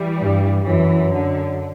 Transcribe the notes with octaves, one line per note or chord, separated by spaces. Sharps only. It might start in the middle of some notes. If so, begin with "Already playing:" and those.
Already playing: E3 G3
G2
F#2 E3
D3